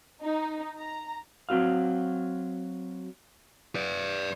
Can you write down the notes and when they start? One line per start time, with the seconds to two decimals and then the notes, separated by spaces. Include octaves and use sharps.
0.21 D#4
0.80 A#5
1.49 F#3 C4 F#4 F5
3.75 B4 D5